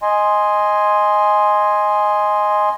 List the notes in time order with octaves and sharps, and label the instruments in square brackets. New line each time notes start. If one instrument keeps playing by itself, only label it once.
[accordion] D#5 G#5 C6